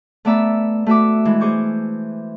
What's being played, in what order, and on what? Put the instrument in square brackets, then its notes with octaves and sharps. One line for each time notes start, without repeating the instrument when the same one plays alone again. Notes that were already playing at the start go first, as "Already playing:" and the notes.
[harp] A3 B3 D5 E5 A#5 E6
A3 F#4 E5 D6
E3 G#3
G#4 C5 C#6 D6 G6